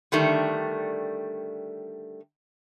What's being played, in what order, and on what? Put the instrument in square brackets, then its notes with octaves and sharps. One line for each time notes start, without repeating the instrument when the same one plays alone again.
[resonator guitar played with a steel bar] D3 D#3 G3 A3